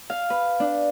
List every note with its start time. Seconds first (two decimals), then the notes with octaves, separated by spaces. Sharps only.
0.10 F5
0.30 B4
0.60 D4